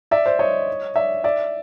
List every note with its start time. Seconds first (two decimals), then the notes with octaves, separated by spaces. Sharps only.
0.11 D5 E5
0.26 C5 D5
0.39 C#5 D#5
0.96 D5 E5
1.24 D5 E5